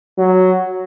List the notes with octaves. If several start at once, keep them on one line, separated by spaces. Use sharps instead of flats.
F#3